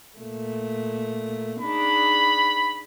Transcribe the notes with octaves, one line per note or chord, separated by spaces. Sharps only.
A#2 A3
D4 D#4 G#4 B5